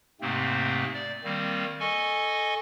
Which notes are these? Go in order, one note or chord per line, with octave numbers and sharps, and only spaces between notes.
G#2 C3 A3 A#3 C4
D5
D#3 G3 A#3 C4
A4 D#5 G#5 C#6